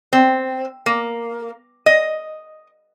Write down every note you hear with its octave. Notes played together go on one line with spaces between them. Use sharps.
C4
A#3
D#5